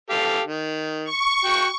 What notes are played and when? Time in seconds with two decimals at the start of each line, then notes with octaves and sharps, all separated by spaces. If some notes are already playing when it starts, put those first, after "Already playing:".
0.10 G4 A4 F5
0.46 D#3
1.04 C#6
1.45 F#4 G5